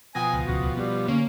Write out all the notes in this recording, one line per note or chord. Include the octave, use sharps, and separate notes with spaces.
B2 F3 G5 G#5 D#6 A#6
C#2
D1 C2 C#3 F#4
G3 B3
D3 A#3 C#4